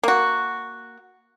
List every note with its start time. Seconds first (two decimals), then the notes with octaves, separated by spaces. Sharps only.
0.03 A#3 F#4